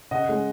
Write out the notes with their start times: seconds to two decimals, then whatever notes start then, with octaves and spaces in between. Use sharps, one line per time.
0.11 C#3 D#5 F#5
0.29 G#3 C#4